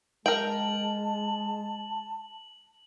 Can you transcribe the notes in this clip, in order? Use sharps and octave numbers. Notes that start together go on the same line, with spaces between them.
G#3 A#4 G5 A5 F#7